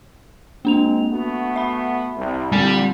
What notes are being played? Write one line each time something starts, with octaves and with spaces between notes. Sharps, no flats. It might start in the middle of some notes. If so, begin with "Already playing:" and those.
G#3 A#3 C4 D4 F7
A3 B3 F#4
E5 B5
C2
A#2 D3 G3 C4